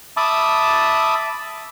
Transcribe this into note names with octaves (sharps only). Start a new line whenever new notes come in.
E5 A5 B5 D6 D#6